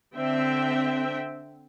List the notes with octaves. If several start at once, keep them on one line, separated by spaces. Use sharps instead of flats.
D3 C4 E5 G5